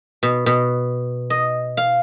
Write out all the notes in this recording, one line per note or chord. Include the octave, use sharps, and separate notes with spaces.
B2
B2
D#5
F5